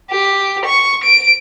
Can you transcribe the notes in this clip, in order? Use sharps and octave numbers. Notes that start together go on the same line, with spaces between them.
G4
C#6
D7